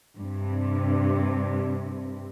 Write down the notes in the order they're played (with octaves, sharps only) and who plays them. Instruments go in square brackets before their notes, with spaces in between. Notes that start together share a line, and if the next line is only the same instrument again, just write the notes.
[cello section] G2 C3